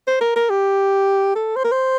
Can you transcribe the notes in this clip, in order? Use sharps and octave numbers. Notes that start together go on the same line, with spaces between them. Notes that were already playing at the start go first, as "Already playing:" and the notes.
C5
A#4
A#4
G4
A4
C5
A#4
C5